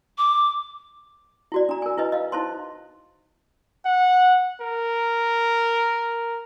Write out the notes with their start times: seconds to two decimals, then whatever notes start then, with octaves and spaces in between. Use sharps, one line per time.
0.18 D6
1.52 E4 F#4 D5
1.69 D4 A#5
1.82 A#4 G#5
1.98 E4 B4 D#5
2.12 D#5 F5
2.32 D#4 E4 C5 A5 C6
3.85 F#5
4.61 A#4